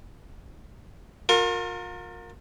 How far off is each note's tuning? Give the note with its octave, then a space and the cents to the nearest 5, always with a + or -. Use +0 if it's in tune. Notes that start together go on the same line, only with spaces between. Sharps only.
F4 +40 A#4 -15